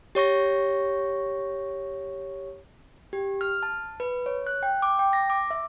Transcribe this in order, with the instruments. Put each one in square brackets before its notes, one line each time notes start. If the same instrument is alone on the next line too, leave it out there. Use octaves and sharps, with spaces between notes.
[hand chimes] G4 C#5 C#6 A#6
G4
F6
A5
B4
C#5
F#6
G5
D6
G5
A#6
D6
E5